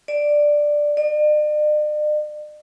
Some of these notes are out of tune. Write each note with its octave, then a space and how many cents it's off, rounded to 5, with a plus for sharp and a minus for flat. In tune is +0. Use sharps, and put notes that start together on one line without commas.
D5 +5
D5 +45